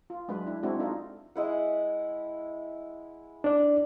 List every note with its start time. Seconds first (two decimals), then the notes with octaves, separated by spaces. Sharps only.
0.10 F4
0.28 F#3 G#3 D4 B4
0.46 D4 E4
0.63 G#3 C4 D4 E4 F#4
0.79 D4 D#4 F4 A4
1.36 G#3 E4 F#5
3.44 D4 D5